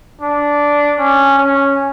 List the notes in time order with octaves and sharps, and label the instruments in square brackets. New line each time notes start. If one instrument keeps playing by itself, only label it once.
[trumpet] D4
C#4
C#4